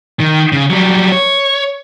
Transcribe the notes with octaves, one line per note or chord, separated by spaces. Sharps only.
D#3
C#3
F#3 G3
C#5